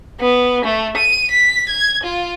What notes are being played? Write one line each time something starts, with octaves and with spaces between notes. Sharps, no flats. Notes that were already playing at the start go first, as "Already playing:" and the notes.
B3
A3
D#7
B6
G#6
F4